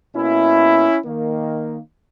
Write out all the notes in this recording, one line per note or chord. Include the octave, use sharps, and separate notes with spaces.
B2 A#3 C#4 E4
D#3 A#3